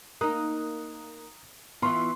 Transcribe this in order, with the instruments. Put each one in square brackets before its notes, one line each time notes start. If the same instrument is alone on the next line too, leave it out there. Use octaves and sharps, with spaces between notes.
[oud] A#3 D#4 [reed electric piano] A#5 D#6 F#6
[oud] E3 F4 [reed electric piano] B3 C#6 [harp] C6